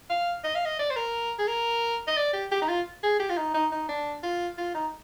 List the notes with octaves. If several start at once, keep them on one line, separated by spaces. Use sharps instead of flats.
F5
D#5
F5
D#5
D5
C5
A#4
G#4
A#4
D#5
D5
G4
G4
D#4
F4
G#4
G4
F4
D#4
D#4
D#4
D4
F4
F4
D#4